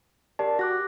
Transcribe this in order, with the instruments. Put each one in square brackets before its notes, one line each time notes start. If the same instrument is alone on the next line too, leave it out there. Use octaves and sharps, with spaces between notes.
[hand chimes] G4 [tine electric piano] A#4 D5 A5
[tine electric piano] F#4 [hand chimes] D6 F#6 A#6